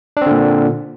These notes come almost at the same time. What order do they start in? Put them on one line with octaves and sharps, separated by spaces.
D4 C4 D3 A#2